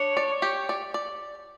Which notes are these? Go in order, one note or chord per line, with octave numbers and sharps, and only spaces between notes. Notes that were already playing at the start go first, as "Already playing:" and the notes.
Already playing: D4 C#5
D5
G4
D5
D5